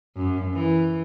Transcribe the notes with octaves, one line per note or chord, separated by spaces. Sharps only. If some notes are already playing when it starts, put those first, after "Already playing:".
F#2
E3